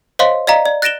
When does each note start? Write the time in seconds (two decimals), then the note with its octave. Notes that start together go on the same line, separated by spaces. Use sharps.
0.19 C5 C#5 D#5 F5 C6
0.47 D5 D#5 F5 A#5
0.65 D5
0.82 F#6 A6 A#6 D7 E7 G7